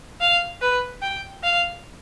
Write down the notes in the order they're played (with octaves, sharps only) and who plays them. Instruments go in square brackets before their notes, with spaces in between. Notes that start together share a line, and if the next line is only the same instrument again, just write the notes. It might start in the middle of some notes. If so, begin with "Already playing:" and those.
[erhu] F5
B4
G5
F5